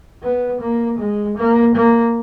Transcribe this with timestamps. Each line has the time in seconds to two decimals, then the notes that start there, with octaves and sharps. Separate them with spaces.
0.23 B3
0.61 A#3
0.99 G#3
1.37 A#3
1.75 A#3